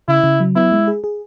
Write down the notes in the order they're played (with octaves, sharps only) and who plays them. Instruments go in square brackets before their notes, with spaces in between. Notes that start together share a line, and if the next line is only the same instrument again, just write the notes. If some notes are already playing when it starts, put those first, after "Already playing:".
[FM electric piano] C#3 [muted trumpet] E4
[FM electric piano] C#3
F#3
[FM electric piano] B3 [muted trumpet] E4
[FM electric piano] G#3
G#4
G#4